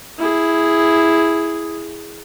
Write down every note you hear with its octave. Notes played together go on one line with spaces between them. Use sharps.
E4 G#4